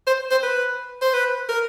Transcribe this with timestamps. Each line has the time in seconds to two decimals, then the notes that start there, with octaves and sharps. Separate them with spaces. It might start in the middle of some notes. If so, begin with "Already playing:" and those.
0.07 C5
0.31 C5
0.43 B4
1.02 C5
1.13 B4
1.49 A#4